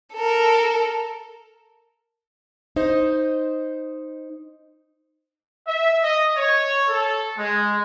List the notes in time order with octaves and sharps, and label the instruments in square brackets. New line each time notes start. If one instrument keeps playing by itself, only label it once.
[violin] A4 A#4
[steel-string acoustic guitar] D#4 C5 D#5
[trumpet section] E5
D#5
C#5
A4
G#3